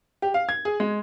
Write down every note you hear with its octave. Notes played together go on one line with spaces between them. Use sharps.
G4
F5
G#6
G#4
G#3